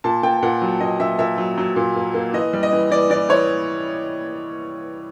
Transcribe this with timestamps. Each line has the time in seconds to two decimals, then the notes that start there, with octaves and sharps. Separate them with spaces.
0.04 A#2 A5
0.23 A#2 G5
0.42 A#2 F#5
0.61 F#3
0.80 A#2 D#5
0.99 A#2 E5
1.19 A#2 E5
1.38 F#3
1.58 F#3
1.76 A#2
1.96 A#3
2.14 A#3
2.33 E3 D#5
2.53 G3
2.63 D#5
2.72 E3
2.91 E3 D5
3.10 E3 D5
3.29 E3 C#5